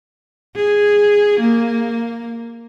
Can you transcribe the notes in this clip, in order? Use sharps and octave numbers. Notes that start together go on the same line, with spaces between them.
G#4
A#3